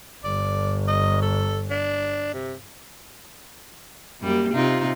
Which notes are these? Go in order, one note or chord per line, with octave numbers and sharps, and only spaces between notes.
G1 D5
D#5
A4
D4
C3
F#2 G3 A#3
C3 D#4 F4